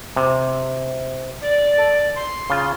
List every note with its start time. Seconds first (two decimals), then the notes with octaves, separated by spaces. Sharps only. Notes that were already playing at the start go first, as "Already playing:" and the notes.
0.16 C3
1.41 D5
1.78 A4
2.15 C6
2.50 C#3 F4